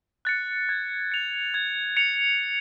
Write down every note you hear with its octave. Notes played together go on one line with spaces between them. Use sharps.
F#6 A6 C#7
G#6
C#7 F7
G#6
C#7 F7